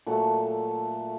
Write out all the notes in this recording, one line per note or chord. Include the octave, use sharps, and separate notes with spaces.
A#2 F#3 A3 A4